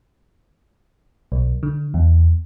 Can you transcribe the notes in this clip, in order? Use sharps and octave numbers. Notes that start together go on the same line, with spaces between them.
B1
D3
E2